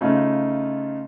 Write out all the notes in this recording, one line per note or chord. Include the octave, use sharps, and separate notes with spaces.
C#3 A3 D#4 F4